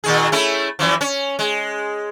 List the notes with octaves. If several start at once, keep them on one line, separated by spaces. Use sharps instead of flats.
A#2 D#3 G#4
A3 C#4 E4
F#2 E3 F3
C#4
G#3